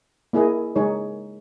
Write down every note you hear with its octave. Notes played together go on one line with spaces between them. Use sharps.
A#3 E4 G#4 D#5
G#3 D#4 G#4 C#5